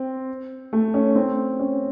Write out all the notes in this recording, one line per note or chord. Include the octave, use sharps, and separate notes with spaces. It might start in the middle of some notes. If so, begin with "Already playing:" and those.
Already playing: C4
A3
C#4
C4
C#4